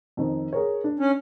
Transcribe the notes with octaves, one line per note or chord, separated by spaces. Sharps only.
F2 D#3
G#4 A#4 C#5
D4
C#4